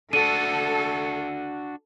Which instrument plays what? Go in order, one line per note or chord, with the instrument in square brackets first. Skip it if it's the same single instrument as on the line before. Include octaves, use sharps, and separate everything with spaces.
[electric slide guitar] D4 F#4 [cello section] A4 [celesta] D#7